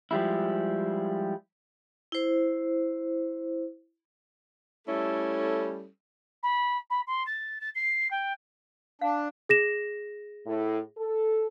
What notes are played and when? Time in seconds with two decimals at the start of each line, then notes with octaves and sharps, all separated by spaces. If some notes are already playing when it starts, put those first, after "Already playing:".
0.11 F3 G3 G#3 E4
2.12 E4 C5
4.87 G3 A3 C#4 E4 A4
6.43 B5
6.90 B5
7.07 C6
7.26 A6
7.61 A6
7.75 C7
8.11 G5
9.01 D4 F5
9.49 G#4 A#6 E7
10.46 A2
10.98 A4